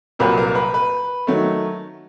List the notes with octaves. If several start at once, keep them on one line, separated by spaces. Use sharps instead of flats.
C2 A#2 F#3 A#3 B4
A#4
B4
B4
D#3 F#3 A3